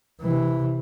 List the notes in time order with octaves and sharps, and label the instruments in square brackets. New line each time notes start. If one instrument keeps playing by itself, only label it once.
[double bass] C3 E3